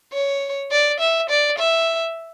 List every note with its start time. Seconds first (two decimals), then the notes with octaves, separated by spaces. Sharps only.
0.12 C#5
0.71 D5
1.00 E5
1.30 D5
1.58 E5